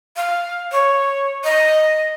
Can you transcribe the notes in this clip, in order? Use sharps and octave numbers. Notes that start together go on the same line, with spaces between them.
F5
C#5
D#5